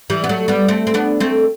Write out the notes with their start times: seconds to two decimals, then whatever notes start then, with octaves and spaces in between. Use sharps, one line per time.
0.10 E3 G3
0.24 B3
0.29 F#3 A3
0.48 G3 B3
0.68 A3 C4
0.87 C4
0.94 B3 D4
1.20 A3 C4